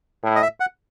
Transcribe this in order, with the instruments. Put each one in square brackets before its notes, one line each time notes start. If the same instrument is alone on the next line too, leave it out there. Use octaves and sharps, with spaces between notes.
[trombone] A2
[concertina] D#5
E5
F#5